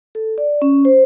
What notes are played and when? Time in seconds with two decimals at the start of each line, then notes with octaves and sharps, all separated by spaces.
0.15 A4
0.38 D5
0.62 C#4
0.85 C5